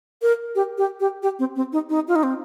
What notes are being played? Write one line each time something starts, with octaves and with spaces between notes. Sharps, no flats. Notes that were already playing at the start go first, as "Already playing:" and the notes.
A#4
G4
G4
G4
G4
C4
C4
D#4
D#4
F4
D#4
C4